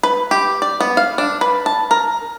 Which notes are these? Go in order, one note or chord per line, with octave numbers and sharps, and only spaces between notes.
B4
G4
D5
B3
F5
D4
B4
A5
A#4